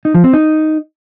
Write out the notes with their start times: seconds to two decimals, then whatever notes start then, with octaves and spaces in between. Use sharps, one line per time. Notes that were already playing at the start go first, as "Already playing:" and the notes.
0.05 D#4
0.14 F3
0.24 C4
0.33 D#4